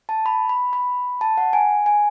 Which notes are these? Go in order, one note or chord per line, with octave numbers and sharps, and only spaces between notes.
A5
B5
B5
B5
A5
F#5
G#5
G#5